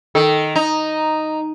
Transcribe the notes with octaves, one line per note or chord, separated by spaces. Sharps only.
D#3 A4
D#4 A#5